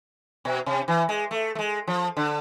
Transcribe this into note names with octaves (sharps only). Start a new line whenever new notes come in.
B2
C3
E3
G#3
A3
A3
G#3
F3
D3